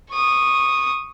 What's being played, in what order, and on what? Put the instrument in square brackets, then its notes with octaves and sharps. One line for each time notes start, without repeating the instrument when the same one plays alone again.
[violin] C#6 D#6